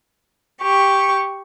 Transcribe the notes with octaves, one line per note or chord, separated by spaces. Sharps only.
G4 C#6